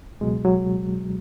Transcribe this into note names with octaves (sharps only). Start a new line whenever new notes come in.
C#2 B2 F#3 G#3
F#3